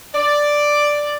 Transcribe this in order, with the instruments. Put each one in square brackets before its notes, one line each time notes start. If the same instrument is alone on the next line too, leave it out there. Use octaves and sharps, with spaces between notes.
[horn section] D5